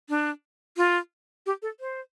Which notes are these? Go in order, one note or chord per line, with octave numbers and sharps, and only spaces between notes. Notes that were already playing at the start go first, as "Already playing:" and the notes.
D4
F4
G4
A4
C5